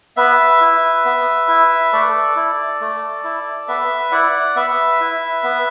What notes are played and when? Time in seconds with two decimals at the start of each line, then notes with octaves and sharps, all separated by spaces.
0.17 B3 B4 E5
0.61 E4
1.05 B3
1.48 E4
1.93 A3 A4 D5
2.36 E4
2.81 A3
3.24 E4
3.68 B3 B4 E5
4.12 E4 D5 F#5
4.56 B3 B4 E5
5.01 E4
5.43 B3